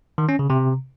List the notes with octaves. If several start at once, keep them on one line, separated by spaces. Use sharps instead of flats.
D#3
C#4
C#3
C3